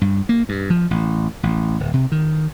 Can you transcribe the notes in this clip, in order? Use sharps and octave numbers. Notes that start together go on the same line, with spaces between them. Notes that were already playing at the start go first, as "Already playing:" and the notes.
G2
A#3
G2
F3
A1
A1
D1
C3
D#3